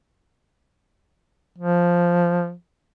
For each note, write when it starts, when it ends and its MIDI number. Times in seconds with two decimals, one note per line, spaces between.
1.58 2.53 53